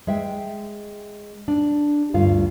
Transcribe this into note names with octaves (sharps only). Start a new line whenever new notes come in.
G#3 E5 G5
D4
D2 G2 F4 F5